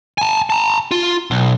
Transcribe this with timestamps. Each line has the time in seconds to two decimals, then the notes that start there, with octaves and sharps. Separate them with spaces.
0.18 G#5 A5
0.50 A5 A#5
0.91 F4
1.31 B1